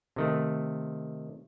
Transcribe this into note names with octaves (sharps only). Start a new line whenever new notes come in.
C3 D#3 A3